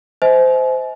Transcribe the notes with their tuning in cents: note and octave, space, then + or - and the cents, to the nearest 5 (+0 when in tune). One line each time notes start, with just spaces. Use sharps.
C5 -20 D#5 +45 G#5 +40